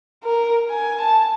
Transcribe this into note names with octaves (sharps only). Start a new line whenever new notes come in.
A#4
G#5
A5